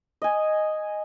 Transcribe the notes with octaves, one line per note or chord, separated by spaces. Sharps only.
D#5 G#5